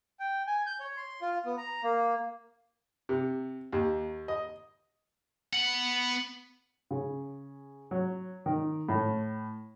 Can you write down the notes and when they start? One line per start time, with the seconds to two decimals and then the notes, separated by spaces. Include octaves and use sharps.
0.19 G5
0.47 G#5
0.66 G6
0.80 C#5
0.97 C6
1.22 F4
1.45 B3
1.58 A#5
1.83 A#3
3.09 C3
3.73 D#2
4.28 D#5
5.53 B3 F#5
6.91 C#3
7.91 F#3
8.46 D#3
8.89 A2